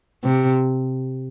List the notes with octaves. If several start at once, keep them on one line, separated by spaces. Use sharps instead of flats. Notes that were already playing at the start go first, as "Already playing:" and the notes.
C3